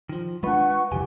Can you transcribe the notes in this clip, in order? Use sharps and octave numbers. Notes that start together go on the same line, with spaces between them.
D#3 F3
G#3 D4 F4 B4 F#5 C#6
F1 C2 E3 G4 G#5